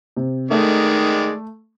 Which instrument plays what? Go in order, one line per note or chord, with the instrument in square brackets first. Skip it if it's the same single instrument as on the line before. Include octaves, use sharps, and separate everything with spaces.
[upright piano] C3
[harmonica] D#3 G#3 D5 [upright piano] A3